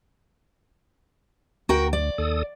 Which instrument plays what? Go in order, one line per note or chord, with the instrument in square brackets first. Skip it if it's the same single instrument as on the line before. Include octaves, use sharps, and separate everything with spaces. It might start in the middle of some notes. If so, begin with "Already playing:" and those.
[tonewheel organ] D2 [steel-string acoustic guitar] F#4 A#4 G5
[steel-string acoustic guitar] D5
[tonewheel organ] D#2 A4 D#6